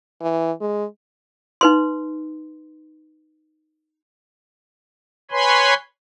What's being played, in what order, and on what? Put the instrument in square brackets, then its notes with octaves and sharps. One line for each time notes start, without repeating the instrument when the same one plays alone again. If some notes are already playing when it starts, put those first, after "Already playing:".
[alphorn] E3
G#3
[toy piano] D#4 B4 C6
[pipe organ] B4 C#5 G#5 B5 C6